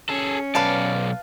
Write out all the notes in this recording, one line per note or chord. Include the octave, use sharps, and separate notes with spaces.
C#4 G#4 A4
B1 B4 D5 F5 A5